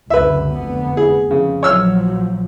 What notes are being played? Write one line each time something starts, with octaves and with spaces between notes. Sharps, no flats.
C#2 F#2 D3 B4 E5
F1 D3 B3
G#4
F2 C#3
A#1 F3 F#3 C#5 E6 F6